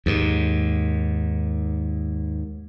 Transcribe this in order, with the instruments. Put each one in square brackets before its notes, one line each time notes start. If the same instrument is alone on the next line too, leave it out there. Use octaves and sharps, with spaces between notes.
[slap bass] D#2 G#2